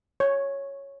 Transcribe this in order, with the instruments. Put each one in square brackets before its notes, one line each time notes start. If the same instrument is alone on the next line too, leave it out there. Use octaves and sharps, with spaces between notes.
[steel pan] C#5